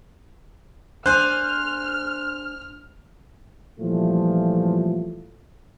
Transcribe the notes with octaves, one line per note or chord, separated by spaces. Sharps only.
D4 C5 G#5 F6 F#6
A#2 E3 F3 G3 A3 F4